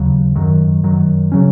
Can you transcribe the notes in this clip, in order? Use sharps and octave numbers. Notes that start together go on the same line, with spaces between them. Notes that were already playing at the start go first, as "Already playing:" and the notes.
Already playing: D#2 C#3 F#3
F#2 D#3 F#3
F#2 D#3 F#3
C#3 F#3 C#4